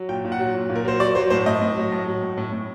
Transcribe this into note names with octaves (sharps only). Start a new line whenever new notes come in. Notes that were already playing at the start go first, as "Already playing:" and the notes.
Already playing: F#3
A#2 G5
A#2
F#5
F#3
A#2
A#2
A#4
F#3 C5
F#3 D5
F#3 C5
A2 C5
A2 D#5
A2
F#3
A2
F#3
A2
A2
A2